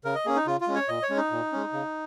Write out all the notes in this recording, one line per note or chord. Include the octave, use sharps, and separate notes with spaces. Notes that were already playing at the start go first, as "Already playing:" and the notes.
C#3 A#4
D#5
A#3 C#4 G#4
D#4
C#3 F4
F4
G#3 C#4
C#5
A#2 D#5
C#5
G#3 C#4
D#4
A#2
G#3 C#4
C#3